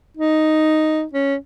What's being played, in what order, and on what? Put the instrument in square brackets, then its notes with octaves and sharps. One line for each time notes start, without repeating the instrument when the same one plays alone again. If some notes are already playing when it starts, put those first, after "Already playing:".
[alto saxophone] D#4
C#4